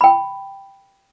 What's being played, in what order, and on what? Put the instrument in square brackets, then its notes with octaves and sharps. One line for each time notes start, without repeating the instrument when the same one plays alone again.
[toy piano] G5 B5